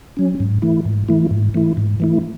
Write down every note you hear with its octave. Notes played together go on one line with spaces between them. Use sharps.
F#3 C#4
G#2
E3 A3 E4
G#2
E3 A3 E4
G#2
E3 A3 E4
G#2
E3 A3 E4